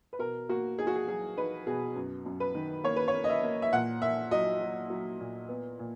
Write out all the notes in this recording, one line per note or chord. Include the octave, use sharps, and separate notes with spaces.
B4
B2 A#4
A#3 F#4
D#4 G#4
F#4
G#4
F#3 G#4
D#4 B4
B2 G#4
F#2
F#2
B4
D#3
A#3 C#5
B4
C#5
A#3
D#5
E5
A#3
E5
A#2 F#5
A#3 E5
F#3 D#5
F#3
F#3
A#2
B3
A#2